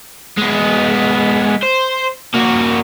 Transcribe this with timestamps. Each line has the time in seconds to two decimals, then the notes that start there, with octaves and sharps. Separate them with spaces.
0.37 G#3 B3
1.63 C5
2.35 A#3 F#4